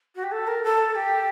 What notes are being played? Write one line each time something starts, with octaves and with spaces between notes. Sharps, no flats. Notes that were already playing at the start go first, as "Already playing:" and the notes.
F#4
G4
A4
A#4
A4
G4